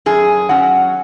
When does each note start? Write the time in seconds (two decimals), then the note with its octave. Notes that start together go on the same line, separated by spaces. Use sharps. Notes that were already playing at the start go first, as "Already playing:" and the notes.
0.06 F#2 G#4
0.49 F#3 C#4 F#5